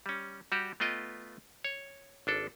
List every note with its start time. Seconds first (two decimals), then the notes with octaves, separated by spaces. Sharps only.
0.06 G3 C#4
0.52 G3 F#4 G4
0.80 A3 B3 F4 D#5 G5
1.64 C#5
2.27 G#1 D4 A4